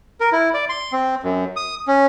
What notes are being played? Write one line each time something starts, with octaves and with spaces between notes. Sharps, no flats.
A#4
E4
D5
C6
C4
F#2
D#6
C#4